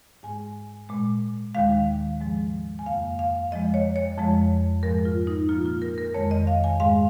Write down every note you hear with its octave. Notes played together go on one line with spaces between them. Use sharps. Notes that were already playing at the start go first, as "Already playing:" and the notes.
G#2 G#3 G#5
A#2 G#3
D#2 D#3 G#3 F5
G#2 F3 G#3
G#5
F2 C#3 A#3 F5
F5
F2 F3 G#3 D#5
C#5
C#5
F2 F3 G#3
G#2 F3 G#3 A#4
F4
D#4
A#2 F3 A#3 F4
F4
A#4
A#4
F2 D#3 G#3 C#5
D#5
F5
G#5
G#2 G#3 F5